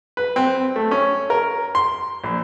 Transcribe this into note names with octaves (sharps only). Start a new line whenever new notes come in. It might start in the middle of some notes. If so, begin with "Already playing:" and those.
B4
C4
A3
C#4
A#4
C6
A#1